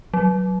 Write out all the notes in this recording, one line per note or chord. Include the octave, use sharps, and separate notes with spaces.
F#3